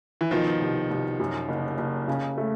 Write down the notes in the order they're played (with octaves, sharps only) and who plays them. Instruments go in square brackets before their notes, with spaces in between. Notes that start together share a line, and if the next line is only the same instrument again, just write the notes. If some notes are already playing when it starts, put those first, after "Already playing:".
[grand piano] E3
[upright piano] B2 [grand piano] D#3 F3
[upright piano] C2
C2
F#2
F#1
F#1
C#3
A3